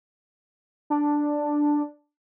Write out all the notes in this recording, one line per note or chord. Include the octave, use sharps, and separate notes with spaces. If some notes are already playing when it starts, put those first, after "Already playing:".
D4